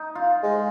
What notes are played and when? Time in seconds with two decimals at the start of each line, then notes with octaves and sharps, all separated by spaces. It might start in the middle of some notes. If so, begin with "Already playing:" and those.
Already playing: D#4
0.15 F4
0.43 G#3